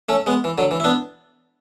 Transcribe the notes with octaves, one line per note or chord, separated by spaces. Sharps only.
A3 C#4
G#3 B3
E3
D3 F#3
E3
E4
B3 D4